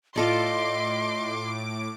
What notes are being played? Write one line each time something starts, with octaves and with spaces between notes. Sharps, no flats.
A2 F4 A4 D5 D#5 C6 D6 D7